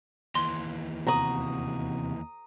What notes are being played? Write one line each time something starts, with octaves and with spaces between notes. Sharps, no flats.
D#2 E3 C6
E2 C3 F#4 A#5 D#6